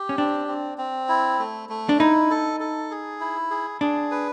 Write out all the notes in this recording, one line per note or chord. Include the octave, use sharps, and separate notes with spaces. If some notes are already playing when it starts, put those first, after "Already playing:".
Already playing: G4
C#4
C4 D4
C4
C4
E4
A3
A3
D4
D#4 E4
A4
A4
G#4
E4
G#4
D4 G#4
B4